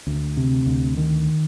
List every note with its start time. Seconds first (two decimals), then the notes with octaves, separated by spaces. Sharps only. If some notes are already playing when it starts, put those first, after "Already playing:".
0.07 D2
0.37 C3
0.66 D2
0.97 D#3